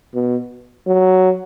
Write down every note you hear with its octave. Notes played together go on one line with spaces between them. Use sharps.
B2
F#3